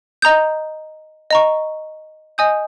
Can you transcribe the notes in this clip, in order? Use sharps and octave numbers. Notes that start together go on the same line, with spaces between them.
D#5 A#5 D#6 G6
D#5 A#5 C#6
D#5 G#5 D#6 G6